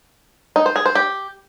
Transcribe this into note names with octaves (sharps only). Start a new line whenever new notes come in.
D#4
C5
G#4
C5
G4